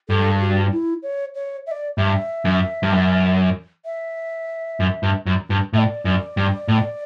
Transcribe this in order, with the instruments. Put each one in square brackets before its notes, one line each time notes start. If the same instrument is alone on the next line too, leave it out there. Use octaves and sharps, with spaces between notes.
[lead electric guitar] G2 [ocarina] A4
[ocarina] F#4
E4
C#5
C#5
E5
D5
[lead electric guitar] G2 [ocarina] E5
[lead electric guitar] F#2
G2
F#2
[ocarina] E5
[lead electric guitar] F#2
G2
F#2
G2
[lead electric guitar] A2 [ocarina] E5
[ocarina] D5
[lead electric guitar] F#2
G2
A2